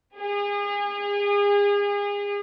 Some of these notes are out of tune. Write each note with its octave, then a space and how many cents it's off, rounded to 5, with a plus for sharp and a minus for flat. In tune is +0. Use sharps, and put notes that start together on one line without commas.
G#4 -35